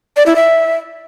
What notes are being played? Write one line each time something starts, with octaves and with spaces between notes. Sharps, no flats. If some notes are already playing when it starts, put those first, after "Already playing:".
D5
E4
E5